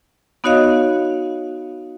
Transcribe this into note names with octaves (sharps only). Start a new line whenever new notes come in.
B3 D#4 F#4 C#5 D#5 F5